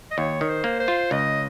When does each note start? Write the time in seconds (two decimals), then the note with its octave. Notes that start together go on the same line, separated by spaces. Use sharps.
0.11 D#5
0.18 D#2 C#5
0.41 D#3
0.49 C5
0.64 A#3
0.80 C5
0.88 F4
1.11 C#2 D#5